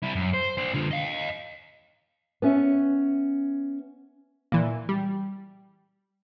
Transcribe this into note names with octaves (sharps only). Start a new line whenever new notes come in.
G3 E4
F#2
C5
D4 C5
D3 F4
D#5 F5
B3 C#4 E5
A#2 E3
G3